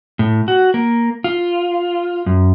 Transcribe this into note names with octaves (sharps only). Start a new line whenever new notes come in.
A2
F#4
A#3
F4
F#2